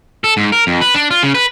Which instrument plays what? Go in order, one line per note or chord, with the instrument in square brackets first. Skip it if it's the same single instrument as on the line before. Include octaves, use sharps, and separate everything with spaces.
[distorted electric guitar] A4
G#2
A#4
F2
B4
D4
F4
C#3
B4